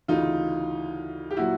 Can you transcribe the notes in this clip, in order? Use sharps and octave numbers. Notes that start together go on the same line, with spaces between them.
D2 C#3 E3 D#4 F4
G4
A#2 F#3 E4 F#4